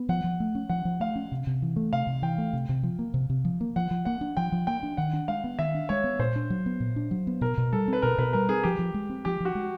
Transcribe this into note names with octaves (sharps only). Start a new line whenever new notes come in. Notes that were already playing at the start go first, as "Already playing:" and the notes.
Already playing: B3
F3 F#5
F3
A3
C#4
F3 F#5
F3
A3 F5
C#4
C3
C3
E3
A3
C3 F5
C3
E3 G5
A3
C3
C3
F3
A#3
C3
C3
F3
A#3
F3 F#5
F3
A#3 F#5
D4
F3 G5
F3
A#3 G5
D4
D#3 F#5
D4
G#3 F5
B3
D#3 E5
D4
G#3 C#5
B3
A#2 C5
D4
F#3
B3
A#2
D4
F#3
B3
B2 A#4
B2
G3 A4
C4 B4
B2 A#4
B2 B4
G3 A#4
C4 G#4
F3 G4
F3
G#3
C4
F3 G4
F3 F#4
G#3